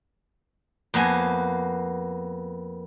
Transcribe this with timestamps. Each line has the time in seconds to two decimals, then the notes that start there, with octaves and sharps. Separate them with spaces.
0.94 F2 A#3 B3 G#5